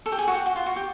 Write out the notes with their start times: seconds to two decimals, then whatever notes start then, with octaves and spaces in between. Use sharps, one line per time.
0.06 A4
0.12 G4
0.18 G#4
0.27 F#4
0.32 G4
0.46 F#4
0.56 F4
0.66 F#4
0.76 G4